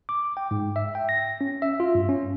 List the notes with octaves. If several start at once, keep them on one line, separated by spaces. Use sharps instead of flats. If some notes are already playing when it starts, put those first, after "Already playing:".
D6
G5
G#2
E5
G5
A#6
C#4
E5
F4
G2
C#4